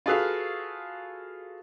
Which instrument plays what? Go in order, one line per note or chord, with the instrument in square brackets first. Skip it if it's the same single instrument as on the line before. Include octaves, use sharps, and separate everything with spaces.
[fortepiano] F4 F#4 G#4 A4 B4 F5